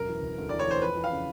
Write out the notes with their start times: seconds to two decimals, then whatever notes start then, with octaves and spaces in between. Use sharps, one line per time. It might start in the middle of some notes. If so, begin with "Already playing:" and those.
Already playing: E1 F#2 A#4
0.08 E3
0.22 E1
0.38 D2
0.49 E3 D5
0.59 C#5
0.67 E3 C5
0.82 F2 B4
0.96 E3
1.04 F5
1.10 C#3